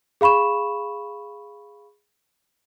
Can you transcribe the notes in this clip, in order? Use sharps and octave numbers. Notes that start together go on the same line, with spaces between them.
G#4 F5 B5 C#6 E7